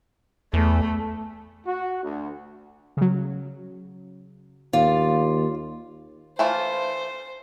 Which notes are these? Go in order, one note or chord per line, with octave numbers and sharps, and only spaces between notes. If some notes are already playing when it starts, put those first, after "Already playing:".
E2 A3
F#4
D2
C#3 F#3
D#2 F4 D5
E3 A3 F4 C5